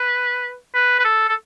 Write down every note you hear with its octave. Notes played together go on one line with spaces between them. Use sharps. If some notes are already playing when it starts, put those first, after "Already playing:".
Already playing: B4
B4
B4
A4
A4